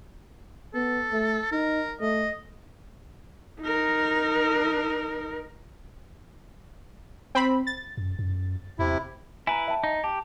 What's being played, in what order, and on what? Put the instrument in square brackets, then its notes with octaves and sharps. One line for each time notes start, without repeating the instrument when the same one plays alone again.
[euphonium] B3 [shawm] A4
[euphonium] A3
[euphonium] D#4 [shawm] A#4
[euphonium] A3 [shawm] D#5
[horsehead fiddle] D#4 A#4
[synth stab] C4 B5
A6
[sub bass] F#2
F#2
[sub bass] E2 [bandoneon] C3 E4
[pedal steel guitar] E4 B4 [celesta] G#5 A#5
[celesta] E5 G5 A5
[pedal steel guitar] D#4
[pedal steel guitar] G4 [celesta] A5